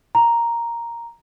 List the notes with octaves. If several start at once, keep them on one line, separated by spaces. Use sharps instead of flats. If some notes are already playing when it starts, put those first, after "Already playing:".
A#5